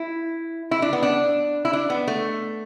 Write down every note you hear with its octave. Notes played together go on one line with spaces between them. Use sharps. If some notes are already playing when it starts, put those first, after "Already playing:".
Already playing: E4
E4
D4
B3
D4
E4
D4
B3
A3